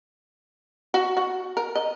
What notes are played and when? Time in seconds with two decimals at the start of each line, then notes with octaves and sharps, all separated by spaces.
0.94 F#4
1.17 F#4
1.57 A#4
1.75 D#5